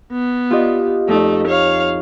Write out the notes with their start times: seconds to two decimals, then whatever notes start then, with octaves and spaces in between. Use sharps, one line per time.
0.12 B3
0.51 F4 G4 D#5
1.08 F2 A3 D#4
1.47 C#5 F5